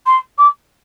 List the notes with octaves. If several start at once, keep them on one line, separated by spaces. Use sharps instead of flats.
C6
D6